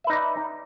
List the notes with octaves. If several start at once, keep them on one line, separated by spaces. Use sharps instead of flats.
D#4 B4 D5 E5